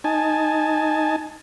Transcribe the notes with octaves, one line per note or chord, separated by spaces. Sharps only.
D#4 G#5 A5